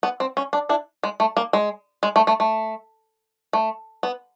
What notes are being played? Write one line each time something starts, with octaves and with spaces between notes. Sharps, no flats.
B3
C4
C#4
D4
D4 E4
G#3
A3
A#3
G#3
G#3
A3
A3
A3
A3
B3